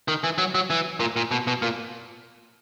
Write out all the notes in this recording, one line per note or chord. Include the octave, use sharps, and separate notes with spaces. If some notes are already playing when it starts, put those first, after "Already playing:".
D#3
E3
F#3
F#3
E3
A#2
A#2
B2
B2
A#2